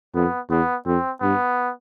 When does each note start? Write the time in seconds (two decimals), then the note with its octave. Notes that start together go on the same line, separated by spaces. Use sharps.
0.15 F2 B3
0.50 E2 B3
0.86 F2 C4
1.21 G2 B3